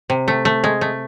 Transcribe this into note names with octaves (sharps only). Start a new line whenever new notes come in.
C3
A3
A3
G#3
A3